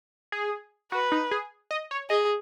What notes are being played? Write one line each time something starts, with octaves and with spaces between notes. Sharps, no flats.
G#4
F#4 B4
D#4
G#4
D#5
C#5
G#4 D#5